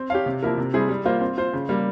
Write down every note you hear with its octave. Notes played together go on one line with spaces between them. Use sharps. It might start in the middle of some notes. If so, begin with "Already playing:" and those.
Already playing: C4
G4 C#5 F5
C3
F3 A#3 E4 A#4
C3
G3 C4 E4 G#4
G3
A#3 F4 C5
C4
F4 C5
C#3
G3 A#3